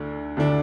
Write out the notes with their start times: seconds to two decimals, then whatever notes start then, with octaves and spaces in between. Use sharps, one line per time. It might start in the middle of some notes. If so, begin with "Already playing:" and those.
Already playing: D2 D3 A3 D4
0.37 D2 D3 A3 D4